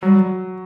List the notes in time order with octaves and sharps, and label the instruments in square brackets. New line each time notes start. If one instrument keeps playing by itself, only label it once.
[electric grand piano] F#3 [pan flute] G3
[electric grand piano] F#3